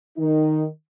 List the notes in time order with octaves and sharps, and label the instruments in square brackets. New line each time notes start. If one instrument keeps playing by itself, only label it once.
[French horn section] D#3 D#4